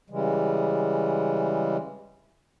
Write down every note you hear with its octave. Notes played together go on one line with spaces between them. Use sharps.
C#3 E3 G3 G#3